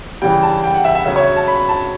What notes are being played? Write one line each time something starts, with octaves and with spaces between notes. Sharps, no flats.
C#3 E3 G3 G5
A5
G5
F#5
E5
E5
C#3 F#3 E5
C#5
A5
B5
A5